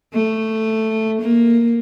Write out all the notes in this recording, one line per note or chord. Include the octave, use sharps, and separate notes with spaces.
A3
A#3